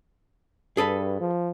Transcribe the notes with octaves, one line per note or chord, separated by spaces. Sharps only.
G2 G#4 A4 B4
F3